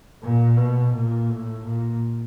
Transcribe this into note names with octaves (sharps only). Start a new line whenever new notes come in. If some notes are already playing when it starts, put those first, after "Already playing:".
A#2
B2
A#2
A2
A#2